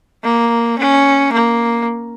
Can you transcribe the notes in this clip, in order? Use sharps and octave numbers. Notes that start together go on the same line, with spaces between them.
A#3
C#4
A#3